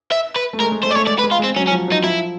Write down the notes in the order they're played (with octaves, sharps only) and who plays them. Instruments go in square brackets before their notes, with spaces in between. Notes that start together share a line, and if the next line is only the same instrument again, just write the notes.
[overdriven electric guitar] E5
B4
[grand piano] A3
[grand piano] G#3 [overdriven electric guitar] A#4
[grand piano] G#3
[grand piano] A3 [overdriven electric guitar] C5
[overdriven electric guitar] D5
[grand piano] A3 [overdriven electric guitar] C#5
[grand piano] G#3 [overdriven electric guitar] D5
[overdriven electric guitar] B4
[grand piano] G#3
[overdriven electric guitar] F4
[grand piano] G#3 [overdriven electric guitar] C4
[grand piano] F#3 [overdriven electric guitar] C#4
[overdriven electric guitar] C#4
[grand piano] F3
[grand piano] F#3 [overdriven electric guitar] D#4
[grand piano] F3 [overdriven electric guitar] E4